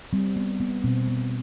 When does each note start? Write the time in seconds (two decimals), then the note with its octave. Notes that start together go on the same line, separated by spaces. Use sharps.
0.13 G3 C4
0.36 B3
0.60 B3
0.84 B2 C4
1.07 B3